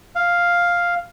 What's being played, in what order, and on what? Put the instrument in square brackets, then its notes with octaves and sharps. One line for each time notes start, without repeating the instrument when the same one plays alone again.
[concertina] F5